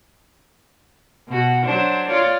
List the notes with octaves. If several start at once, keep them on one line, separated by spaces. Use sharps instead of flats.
B2 F#4
F#3 D4 C5
F4 C#5 D5